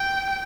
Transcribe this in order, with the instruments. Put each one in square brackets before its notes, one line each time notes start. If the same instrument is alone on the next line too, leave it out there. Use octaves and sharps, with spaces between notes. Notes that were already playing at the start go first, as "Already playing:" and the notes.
Already playing: [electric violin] G5